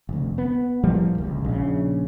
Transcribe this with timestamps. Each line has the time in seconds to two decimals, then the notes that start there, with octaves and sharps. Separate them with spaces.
0.09 F1 D2
0.38 B3
0.84 A2 F3 G3 A#3
1.18 D1 C#2
1.44 A#1 C#3